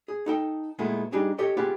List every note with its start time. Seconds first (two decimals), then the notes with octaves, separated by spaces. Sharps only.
0.08 G#4
0.26 D#4 A4 G5
0.79 A#2 G#3 A3 B3 E4
1.12 G3 D4 D#4 G4 G#4
1.38 G4 A4 C#5 D#5 G5
1.57 B3 F4 G4 G#4 B4